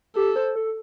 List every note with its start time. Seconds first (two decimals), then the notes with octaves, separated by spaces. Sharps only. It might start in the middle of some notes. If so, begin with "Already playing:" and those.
0.16 G4 A4
0.36 C5
0.56 A4